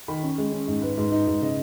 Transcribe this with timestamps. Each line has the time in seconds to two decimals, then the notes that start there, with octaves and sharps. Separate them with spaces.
0.08 D#3 B5
0.23 C#4
0.38 G#3
0.52 C#4
0.68 G#2
0.82 G#2 B4
0.98 G#2
1.12 D#4
1.27 G#2
1.42 C#3 D#5